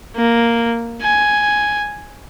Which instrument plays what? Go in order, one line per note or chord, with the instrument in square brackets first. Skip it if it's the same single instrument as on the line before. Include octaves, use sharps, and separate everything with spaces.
[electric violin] A#3
G#5